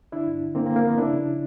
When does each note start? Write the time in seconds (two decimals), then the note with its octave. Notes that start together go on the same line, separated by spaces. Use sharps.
0.12 D3 D4 E4
0.27 G2
0.42 D3
0.55 D3 A#3 C4
0.66 A#3 C4
0.70 D3
0.76 A#3
0.83 F3 B3
0.97 C#3 D4 E4
1.13 C#3